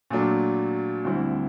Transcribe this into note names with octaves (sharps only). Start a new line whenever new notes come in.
A#2 F#3 A3 D4
D2 D3 G3 C4 E4